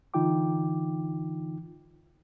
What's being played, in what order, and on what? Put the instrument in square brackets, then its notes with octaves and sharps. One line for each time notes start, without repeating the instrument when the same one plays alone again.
[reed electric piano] D3 E3 D#4 F4 G5 D6